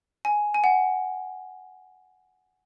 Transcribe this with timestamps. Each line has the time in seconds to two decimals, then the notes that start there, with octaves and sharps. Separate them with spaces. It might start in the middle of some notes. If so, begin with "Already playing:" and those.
0.25 G#5
0.54 G#5
0.64 F#5